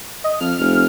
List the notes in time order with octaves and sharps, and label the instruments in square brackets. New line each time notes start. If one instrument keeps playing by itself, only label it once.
[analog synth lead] D#5
[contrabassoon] F2 [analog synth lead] F6
[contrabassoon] F1